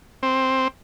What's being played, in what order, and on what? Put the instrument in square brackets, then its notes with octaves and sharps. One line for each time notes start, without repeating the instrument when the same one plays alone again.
[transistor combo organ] C4